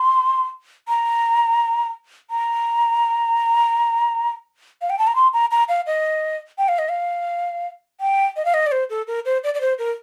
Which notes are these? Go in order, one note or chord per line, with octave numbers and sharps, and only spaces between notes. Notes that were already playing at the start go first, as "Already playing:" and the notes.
Already playing: C6
A#5
A#5
F5
G5
A5
A#5
C6
A#5
A#5
F5
D#5
G5
F5
D#5
F5
G5
D#5
F5
D#5
D5
C5
A4
A#4
C5
D5
D5
C5
A#4